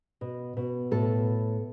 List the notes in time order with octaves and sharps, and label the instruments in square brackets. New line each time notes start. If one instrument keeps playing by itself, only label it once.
[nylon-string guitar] B2
B2
A2 A4